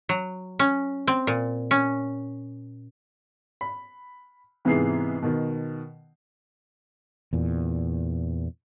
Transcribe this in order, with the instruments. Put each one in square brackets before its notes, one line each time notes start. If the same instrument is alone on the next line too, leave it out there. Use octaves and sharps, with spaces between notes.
[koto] F#3
C#4
C4
A#2
C#4
[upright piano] B5
G#2 C3 E3 B3 G#4 C7
B2 D#3
[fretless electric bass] E2 A#2